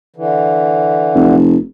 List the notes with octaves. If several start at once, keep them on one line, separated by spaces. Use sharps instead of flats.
D3 E3
F1